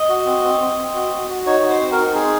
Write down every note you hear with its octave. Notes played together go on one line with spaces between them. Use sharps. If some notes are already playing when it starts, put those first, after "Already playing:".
Already playing: D#5
F#4
C4
C4
C4
C4
F#4
F#4
F#4
D#4 C#5
F#4
C5
C4
A#4
D#4
G#4